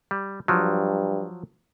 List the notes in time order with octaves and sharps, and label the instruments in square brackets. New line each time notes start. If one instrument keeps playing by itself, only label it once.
[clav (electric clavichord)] G3
[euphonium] G2 [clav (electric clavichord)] F3 F#3